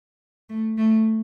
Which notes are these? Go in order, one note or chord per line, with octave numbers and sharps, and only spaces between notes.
A3
A3